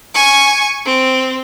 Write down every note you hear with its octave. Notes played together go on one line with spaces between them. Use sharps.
G#5 C#6
C4